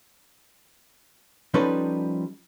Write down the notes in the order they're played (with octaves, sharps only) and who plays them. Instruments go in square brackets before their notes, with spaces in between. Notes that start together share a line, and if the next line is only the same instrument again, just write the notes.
[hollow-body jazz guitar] F3 G3 C#4 D#4 A4 B4